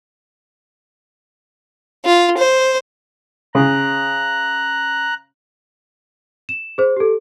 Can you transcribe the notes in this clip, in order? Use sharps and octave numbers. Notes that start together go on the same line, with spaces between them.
F4
C5
C#3 A#5 F#6
E7
G#4 C5
G4 A4